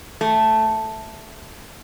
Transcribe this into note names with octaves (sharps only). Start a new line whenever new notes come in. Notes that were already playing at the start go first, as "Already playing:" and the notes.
A3